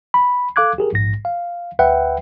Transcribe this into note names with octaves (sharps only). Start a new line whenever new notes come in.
B5
A4 F5 D6 F#6 G#6
G4 G#4 A#4
A#1 G#2 A#6
F5
D2 B4 E5 F#5 G5